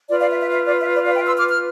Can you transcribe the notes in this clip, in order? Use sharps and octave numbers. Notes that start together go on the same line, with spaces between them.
F4 B4 D5
D5 F5
E5
E5
E5
D5
E5
D5
D5 F5
E5 G5
C6 E6
D6 F6
F6